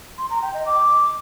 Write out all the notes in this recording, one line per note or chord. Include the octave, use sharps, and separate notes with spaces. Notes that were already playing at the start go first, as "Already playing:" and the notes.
C6
A#5
G5
D#5
D6